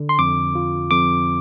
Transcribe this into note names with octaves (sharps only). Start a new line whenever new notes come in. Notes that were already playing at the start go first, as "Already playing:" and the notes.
Already playing: D3
C6
F2 D6
F4
F2 D6